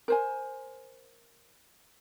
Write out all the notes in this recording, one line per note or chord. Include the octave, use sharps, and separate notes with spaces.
A#4 C5 G#5